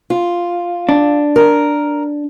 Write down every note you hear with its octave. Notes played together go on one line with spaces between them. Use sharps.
F4
D4
A#4